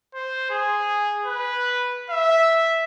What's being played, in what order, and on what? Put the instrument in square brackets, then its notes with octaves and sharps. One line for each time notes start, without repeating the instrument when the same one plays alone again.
[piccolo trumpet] C5
G#4
B4
E5